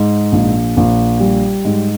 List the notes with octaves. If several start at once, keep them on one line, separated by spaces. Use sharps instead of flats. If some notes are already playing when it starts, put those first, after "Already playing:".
Already playing: G#2
A#1
A#1
G3
G#2